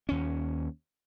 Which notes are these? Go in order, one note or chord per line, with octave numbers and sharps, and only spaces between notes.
D#2 C#4